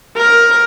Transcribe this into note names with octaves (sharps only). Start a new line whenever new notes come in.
A#4